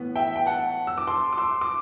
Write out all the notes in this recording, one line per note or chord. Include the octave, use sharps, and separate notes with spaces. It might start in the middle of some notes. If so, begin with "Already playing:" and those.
Already playing: A2 E3 B3
E5 G5
G5
F#5 A5
E6
D6
A5 C6
D6
C6 E6
D6